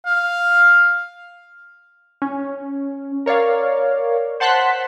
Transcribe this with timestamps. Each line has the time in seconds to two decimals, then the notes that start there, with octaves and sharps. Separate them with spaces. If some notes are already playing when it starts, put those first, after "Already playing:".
0.06 F5
2.22 C#4
3.26 A#4 C#5 D5 F5
4.40 C5 F#5 A5 C6 F#6 B6